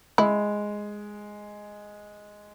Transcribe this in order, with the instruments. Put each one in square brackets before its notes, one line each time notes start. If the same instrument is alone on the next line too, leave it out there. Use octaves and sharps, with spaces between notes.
[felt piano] G#3 [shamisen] E4